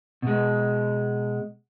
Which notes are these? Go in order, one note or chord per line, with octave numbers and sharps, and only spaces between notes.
B2 G#3